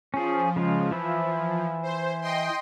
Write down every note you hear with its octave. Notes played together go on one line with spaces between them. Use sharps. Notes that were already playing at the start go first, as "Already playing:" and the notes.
F3 C#4 G#4
C#3 G#3 F4
E3 E4 E6
C5
D#5 G5 C6